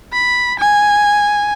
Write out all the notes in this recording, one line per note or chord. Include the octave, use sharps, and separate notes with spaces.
B5
G#5